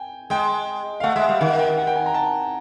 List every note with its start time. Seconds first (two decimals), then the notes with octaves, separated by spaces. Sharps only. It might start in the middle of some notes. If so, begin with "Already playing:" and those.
Already playing: G5 G#5
0.30 G#3 G5
1.00 F5
1.03 A3 F#5
1.16 G#3 E5
1.28 G3 F5
1.41 D#3 F#5
1.59 G5
1.78 F#5
1.87 G5
1.96 G#5
2.06 A#5
2.14 A5